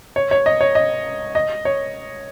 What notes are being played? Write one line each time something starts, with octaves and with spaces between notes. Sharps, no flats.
C#5
C#5
D#5
C#5
D#5
D#5
C#5